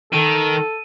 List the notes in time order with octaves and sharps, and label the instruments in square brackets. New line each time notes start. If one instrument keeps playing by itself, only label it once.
[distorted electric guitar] D#3 [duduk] A4 [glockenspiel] D#7